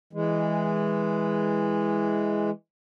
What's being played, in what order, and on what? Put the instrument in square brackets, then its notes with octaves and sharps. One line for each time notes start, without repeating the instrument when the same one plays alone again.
[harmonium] E3 G#3